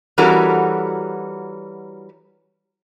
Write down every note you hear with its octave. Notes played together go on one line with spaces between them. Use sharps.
E3 G3 C#4 F#4 A4 A#4